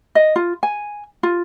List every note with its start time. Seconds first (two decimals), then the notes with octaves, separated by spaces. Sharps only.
0.15 D#5
0.36 F4
0.63 G#5
1.23 F4